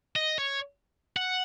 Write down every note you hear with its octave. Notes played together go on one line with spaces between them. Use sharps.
D#5
C#5
F#5